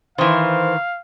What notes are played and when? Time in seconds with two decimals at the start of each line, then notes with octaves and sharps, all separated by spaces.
0.18 D#3 E3 C5 F5